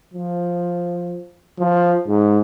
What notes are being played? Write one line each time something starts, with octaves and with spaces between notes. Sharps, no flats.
F3
F3
G#2